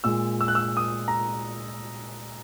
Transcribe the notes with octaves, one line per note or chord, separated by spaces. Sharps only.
A#2 G#3 E6
E6
F#6
E6
D#6
A#5